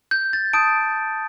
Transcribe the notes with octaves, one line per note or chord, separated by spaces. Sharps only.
G6
A6
A5 D#6 G6 D7